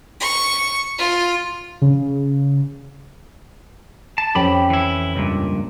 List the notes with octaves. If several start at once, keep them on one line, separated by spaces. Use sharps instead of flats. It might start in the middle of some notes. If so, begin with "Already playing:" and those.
C#6
F4
C#3
A5
F2 C#4 G4 G5 B5
E3 E4
C#2 G2 A#2